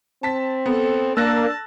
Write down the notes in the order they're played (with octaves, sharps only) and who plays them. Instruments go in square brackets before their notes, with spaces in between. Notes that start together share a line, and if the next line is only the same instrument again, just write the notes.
[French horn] C4 [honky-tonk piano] A5 B6
[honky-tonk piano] B3 [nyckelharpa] A4
[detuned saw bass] A#3 [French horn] D4 [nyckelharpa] A5 [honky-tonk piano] E6 F#6 A#6